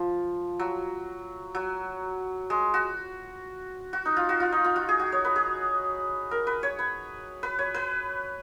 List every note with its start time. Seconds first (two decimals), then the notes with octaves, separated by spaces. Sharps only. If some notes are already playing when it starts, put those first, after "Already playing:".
Already playing: F3
0.60 F#3
1.55 F#3
2.50 G#3
2.74 F#4
3.93 F#4
4.06 D#4
4.17 F4
4.29 F#4
4.40 F4
4.52 D#4
4.65 F4
4.76 F#4
4.89 G#4
5.00 F#4
5.12 C#5
5.25 B4
5.36 G#4
6.31 A#4
6.47 B4
6.63 C#5
6.79 B4
7.43 B4
7.59 C#5
7.74 B4